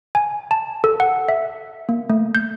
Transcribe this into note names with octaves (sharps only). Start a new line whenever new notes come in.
G#5
A5
A4
F#5
E5
A#3
A3
G6